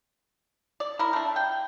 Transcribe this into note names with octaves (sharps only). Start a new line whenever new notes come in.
D5
E4 A#4
A3 D4
G5